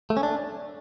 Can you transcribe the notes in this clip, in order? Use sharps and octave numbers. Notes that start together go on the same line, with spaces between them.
A3
C#4
D4